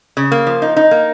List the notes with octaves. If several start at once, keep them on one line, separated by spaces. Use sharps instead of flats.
C#3
A#3
F3
D#4
D#4
A#3